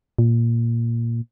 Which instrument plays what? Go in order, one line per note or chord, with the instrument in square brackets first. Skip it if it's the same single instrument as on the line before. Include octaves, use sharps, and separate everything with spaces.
[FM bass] A#2